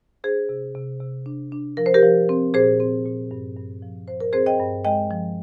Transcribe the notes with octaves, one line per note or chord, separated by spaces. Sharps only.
D4 G#4 C5
C3
C3
C3
D4
D4
F3 A#4
C5
G4 A#4
F3
C4
A#2 G#4 C5
C4
A#2
G2
G2
F3
F3 C5
A#4
C4 G#4 C5
D#5 G5
G2
G#3 D#5 G5
F3